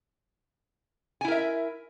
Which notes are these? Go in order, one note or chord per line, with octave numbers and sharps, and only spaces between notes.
E4 A#4 E5 G#5